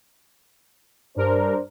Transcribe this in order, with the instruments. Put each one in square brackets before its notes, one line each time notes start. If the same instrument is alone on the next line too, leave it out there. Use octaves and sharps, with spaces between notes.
[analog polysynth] G2 A#4 [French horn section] D4 C5